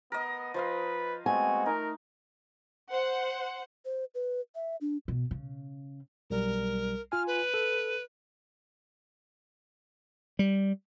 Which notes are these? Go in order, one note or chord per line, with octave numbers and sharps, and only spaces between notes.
B3 A#4 D#5
F3 B4 D#5 F5
G#3 A3 B3 C4 F#4 G#5
D#4 A#4
C5 F#5
C5
B4
E5
D4
B2
C#3
B1 G3 A#4
F4 G#5 F6
B4
A4
G3